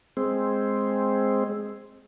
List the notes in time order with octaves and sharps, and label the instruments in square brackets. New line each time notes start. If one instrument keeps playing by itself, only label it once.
[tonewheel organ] G#3 C4